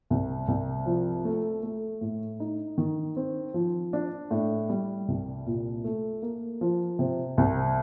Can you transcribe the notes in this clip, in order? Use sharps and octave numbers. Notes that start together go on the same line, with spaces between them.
C2
C2
F3
A3
A3
A2
D#4
D#3
C4
F3
D4
A2
G3
C2
A#2
A3
A#3
F3
C3
C2